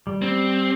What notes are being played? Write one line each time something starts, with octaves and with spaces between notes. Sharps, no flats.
G3
C4